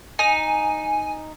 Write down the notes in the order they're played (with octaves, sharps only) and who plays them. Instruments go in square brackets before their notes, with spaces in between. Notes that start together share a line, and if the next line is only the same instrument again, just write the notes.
[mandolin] D#4 [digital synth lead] G#5